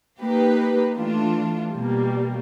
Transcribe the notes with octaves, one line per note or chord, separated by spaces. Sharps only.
A#3 D#4 G4 B4
E3 A3 D4 F4
B2 G3 A#3